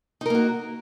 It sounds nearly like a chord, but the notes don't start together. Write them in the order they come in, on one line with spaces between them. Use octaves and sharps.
D#4 A#4 A#3 F#4